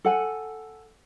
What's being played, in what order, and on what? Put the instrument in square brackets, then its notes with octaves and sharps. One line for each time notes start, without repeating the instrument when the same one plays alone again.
[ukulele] A4 F#5 G#5